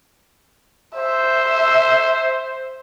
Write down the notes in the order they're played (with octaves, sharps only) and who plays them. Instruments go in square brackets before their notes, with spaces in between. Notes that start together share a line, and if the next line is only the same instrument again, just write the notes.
[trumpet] C5 [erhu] E5